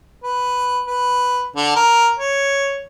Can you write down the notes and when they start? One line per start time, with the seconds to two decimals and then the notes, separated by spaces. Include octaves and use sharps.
0.23 B4
0.87 B4
1.56 D3
1.76 A#4
2.18 C#5